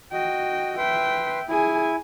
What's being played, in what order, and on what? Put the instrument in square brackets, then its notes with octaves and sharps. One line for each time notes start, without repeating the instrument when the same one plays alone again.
[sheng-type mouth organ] F#4 D#5 [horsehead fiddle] G5
[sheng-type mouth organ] B4 C6 [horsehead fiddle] E5 G5
[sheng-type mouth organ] E4 [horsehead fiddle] G#4 G#5